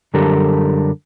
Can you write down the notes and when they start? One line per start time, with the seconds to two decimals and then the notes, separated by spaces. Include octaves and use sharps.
0.14 F#2 D3 G3 G4 A4 A#4